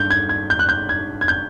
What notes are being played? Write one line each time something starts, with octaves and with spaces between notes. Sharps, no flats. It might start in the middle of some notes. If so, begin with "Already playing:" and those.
Already playing: G2 G6
G#6
G#6
G6
F#6
G6
G#6
G#6
G6